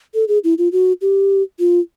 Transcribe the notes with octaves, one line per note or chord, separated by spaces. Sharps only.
A4
G#4
E4
F4
F#4
G4
F4